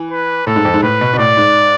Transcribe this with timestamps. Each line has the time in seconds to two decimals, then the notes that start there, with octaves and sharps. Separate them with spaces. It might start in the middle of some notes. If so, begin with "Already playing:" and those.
Already playing: E3
0.11 B4
0.47 A2 A4
0.56 G#2
0.65 F2
0.74 G#2
0.82 A2 B4
1.01 B2
1.13 B2
1.18 A2 D5
1.37 G#2